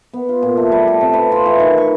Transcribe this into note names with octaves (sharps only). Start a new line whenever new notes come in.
B3
F4
A#2
A3
G3
A4
C3
B4
F4
E3
D#3
C#6